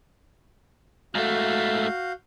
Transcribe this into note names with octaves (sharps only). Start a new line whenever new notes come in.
G#2 A3 F#4 F5 G6